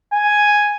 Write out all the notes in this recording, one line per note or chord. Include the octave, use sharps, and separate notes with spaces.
G#5